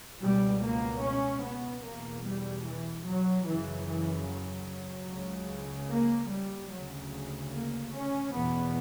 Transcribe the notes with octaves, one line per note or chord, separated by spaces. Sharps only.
C#2 B2 G3
A#3
C#4
B3
E2 B2 A#3
G3
E3
F#3
F#2 C#3 E3
E3
F#3
C#2 C#3
A#3
G3
D2 C#3 F#3
A#3
C#4
E2 B2 B3